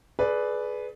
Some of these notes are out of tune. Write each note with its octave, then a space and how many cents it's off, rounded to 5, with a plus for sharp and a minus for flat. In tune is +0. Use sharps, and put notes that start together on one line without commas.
G#4 +30 B4 +0 D5 +0